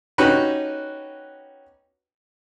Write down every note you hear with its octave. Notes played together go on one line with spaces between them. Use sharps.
C#4 D#4 F#4 G4 B4